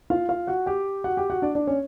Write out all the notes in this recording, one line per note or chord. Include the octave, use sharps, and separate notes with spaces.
F4 F5
F4 F5
F#4 F#5
G4 G5
F#4 F#5
G4 G5
F#4 F#5
D4 D5
D4 D5
C#4 C#5